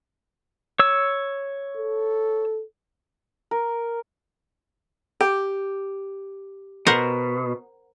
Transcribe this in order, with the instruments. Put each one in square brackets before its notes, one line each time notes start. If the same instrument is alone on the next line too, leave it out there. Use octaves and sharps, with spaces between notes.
[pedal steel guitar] C#5 E6
[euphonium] A4
[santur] A#4
[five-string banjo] G4
[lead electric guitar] B2 [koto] A#4 C5 F#5